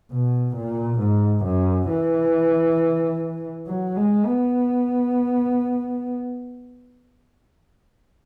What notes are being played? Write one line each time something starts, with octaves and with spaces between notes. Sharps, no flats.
B2
A#2
G#2
F#2
E3
F#3
G#3
B3